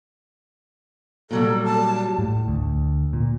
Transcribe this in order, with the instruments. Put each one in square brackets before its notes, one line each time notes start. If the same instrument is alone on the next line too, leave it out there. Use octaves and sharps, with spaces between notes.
[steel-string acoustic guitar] A#2 F#3 G3 [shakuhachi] A4
[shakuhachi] A5
[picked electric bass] A2
D2
A#2